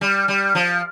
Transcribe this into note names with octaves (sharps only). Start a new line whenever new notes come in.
G3
G3
F3